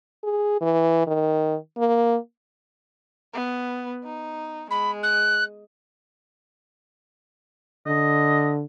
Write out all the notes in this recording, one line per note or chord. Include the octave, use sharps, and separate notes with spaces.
G#4
E3
D#3
A#3
B3
D#4
G#3 B5
F#6
D3 D#5